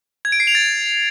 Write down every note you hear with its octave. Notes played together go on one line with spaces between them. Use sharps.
G#6
D7
C7
F7
A6